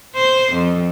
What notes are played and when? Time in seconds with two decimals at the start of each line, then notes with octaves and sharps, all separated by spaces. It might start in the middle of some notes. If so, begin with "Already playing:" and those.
0.16 C5
0.53 F2